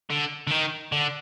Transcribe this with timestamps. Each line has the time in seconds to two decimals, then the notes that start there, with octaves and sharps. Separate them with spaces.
0.10 D3
0.47 D3
0.51 D#3
0.92 D3